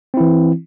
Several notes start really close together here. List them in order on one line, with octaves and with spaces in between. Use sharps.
C4 E4 E3